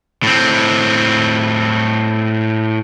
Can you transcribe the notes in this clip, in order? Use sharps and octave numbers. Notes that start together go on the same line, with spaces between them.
A2 C4